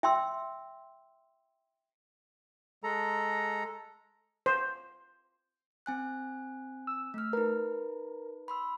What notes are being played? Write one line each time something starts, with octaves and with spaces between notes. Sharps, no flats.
E5 G5 C6 E6
G#3 A4 A#5
C5
C4 G#5 F#6
E6
A3 F6
D#4 A#4 B4
B5 C6 E6